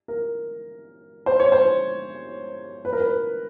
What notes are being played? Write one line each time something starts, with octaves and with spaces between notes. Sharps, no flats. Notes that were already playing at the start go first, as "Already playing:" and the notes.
A#4
C5
C#5
C5
B4
A#4
B4